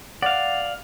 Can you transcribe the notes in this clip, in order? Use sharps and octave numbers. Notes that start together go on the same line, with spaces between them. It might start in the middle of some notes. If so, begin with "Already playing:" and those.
D5 F5 F#5